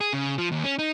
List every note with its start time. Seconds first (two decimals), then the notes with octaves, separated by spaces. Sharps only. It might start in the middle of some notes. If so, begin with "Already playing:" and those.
0.01 G#4
0.13 C#3
0.38 F3
0.52 D#2
0.64 C#4
0.79 D#4